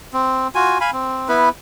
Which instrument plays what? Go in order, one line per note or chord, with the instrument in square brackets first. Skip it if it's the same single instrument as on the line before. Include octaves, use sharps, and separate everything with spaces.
[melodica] C4
F4 F#4 G#5
F5 G#5 B5
C4
B3 E4 B4